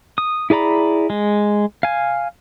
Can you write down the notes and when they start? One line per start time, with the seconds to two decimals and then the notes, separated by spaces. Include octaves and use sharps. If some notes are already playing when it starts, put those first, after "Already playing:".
0.18 D#6
0.50 E4 G#4 D5 A#5 B5
1.10 G#3
1.83 F5 G#5